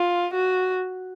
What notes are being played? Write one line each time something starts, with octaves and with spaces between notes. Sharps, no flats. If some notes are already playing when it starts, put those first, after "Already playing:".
Already playing: F4
F#4